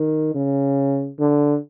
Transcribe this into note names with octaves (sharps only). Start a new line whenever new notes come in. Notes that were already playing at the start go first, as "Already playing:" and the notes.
Already playing: D#3
C#3
D3